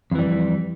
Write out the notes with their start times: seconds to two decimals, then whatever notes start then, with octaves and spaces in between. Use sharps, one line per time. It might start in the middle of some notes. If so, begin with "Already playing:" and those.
0.11 F2
0.15 E3
0.19 G3